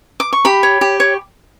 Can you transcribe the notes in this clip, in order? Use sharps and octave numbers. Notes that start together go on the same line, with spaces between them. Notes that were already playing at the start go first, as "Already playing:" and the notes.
D6
C#6
G4 B5
C#5
G4
C#5